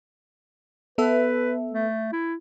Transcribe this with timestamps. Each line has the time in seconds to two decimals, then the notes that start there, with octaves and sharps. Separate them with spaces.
0.98 B3 A4 B4 E5
1.72 A3
2.12 E4